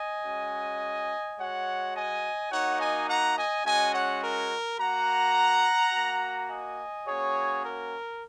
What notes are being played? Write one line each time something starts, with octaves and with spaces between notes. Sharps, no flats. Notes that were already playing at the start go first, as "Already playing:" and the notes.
Already playing: D#5 G#5
G#3 C#4 F#4
G#3 F#4 C#5 F#5
D#5 G#5
A#3 D#4 F#4 C#5 F#5
D#5 G#5
F#5 A#5
D#5 G#5
G#3 C#4 F#4 D#5 G#5
C#5 F#5
A#4
A#3 F#4 F#5 A#5
A#3 F#4
D#5 G#5
A#3 C#4 F#4 G#4 C#5
A#4